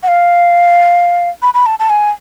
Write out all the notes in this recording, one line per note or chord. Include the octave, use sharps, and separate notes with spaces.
F#5
F5
B5
B5
A5
A5
G#5